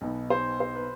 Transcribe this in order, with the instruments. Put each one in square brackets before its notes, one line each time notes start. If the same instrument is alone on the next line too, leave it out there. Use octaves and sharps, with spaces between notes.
[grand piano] B1 B2 B3 D#4
[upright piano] C5
C5
B4